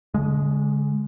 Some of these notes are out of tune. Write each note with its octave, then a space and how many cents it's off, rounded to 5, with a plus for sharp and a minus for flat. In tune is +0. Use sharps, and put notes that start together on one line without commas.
D3 -40 G#3 +0